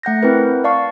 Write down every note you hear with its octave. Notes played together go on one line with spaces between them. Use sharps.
A3 F#5 G6 A#6
C4 E4 A#4 B4
D5 F5 A5 C#6